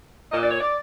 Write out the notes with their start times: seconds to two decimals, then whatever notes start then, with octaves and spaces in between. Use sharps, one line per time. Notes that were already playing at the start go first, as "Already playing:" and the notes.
0.31 A#2 D#5
0.42 D5
0.51 C#5
0.60 D5